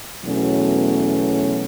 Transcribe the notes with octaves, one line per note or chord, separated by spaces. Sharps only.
E2 B2 F#3 A3 C#4